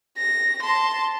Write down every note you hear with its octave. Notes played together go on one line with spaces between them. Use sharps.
A#6
A5 C6